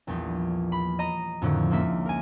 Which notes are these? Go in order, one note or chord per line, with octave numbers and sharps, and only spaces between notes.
A#1 E2 G3
B5
D#5 A#5
F2 A2 D3 D#3
C#2 A#3 E5
A#4 G#5